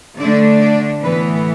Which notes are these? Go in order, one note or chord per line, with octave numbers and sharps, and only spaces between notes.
D3 A3 D4 D5
D5
A2 E3 B3 B4